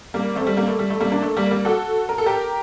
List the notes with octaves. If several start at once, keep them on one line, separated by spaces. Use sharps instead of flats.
G3 A#3
A3 C4
G3
G3 A#3
A3
G3
A3
G3 A#3
A#3 D4
A3
G3 A#3
G3 A#3
F#4 A4
A#4
A4
G4 A#4